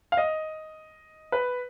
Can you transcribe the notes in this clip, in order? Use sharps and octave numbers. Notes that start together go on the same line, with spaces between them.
F5
D#5
B4